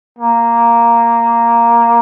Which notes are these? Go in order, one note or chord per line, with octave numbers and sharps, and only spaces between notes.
A#3